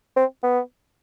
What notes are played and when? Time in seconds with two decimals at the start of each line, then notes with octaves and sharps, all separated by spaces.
0.16 C4
0.43 B3